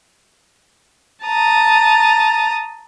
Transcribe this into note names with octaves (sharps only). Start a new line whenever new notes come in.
A5 A#5 D#6